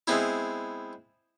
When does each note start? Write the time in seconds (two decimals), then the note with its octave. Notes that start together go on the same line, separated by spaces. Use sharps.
0.07 G#3 B3 C4 E4